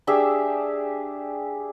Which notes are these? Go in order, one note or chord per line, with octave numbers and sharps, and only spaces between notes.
D4 G4 G#4 E5